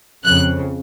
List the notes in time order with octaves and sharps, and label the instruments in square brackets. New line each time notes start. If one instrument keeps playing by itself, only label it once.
[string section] F2 C#3 F#6